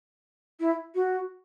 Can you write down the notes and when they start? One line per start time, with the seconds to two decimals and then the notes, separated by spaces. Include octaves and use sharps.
0.60 E4
0.95 F#4